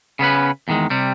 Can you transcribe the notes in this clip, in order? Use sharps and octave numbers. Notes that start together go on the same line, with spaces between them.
C#3 B3 C#4 B4
E2 D#3 G#3
C3 G3